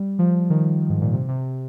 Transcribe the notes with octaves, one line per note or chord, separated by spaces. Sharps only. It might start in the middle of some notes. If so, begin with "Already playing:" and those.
Already playing: G3
F3
D#3
G#2
A#2
C3
C3